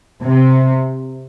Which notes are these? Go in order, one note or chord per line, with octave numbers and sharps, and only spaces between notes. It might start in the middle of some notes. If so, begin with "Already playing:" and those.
C3